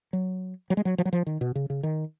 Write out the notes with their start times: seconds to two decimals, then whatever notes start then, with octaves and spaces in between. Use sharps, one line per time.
0.13 F#3
0.70 F#3
0.77 G#3
0.85 F#3
0.98 F3
1.05 F#3
1.13 F3
1.27 D#3
1.41 B2
1.55 C#3
1.70 C#3
1.83 D#3